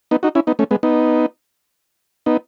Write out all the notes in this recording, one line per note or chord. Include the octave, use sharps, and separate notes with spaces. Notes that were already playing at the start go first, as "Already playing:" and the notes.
B3 D#4
D#4 F#4
C#4 E4
B3 D#4
A3 C#4
G#3 B3
B3 D#4
B3 D#4